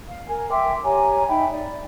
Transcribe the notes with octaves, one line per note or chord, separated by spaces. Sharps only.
F5
A#4 G#5
E5 G5 C6 D6
G4 C#5 G#5 A#5
D#4 E5 G5 B5
D5